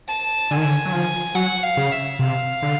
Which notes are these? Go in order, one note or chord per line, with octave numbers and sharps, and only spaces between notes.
A5
D3 G#5
D#3
D3
F#3
F3
F#3 F#5
F5
C#3
E5
C3 F5
D3